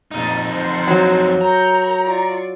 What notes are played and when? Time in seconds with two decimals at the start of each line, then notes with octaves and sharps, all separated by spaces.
0.11 F2 A#2 D#4 D#6 A6
0.49 C5 F#5 A5
0.87 F#3
1.41 A#4 A#5 C#6 G6
2.02 F4 D5 C#6